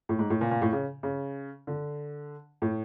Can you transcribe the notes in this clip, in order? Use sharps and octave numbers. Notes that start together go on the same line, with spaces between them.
A2
G#2
A2
A#2
A#2
A2
C#3
C#3
D3
A2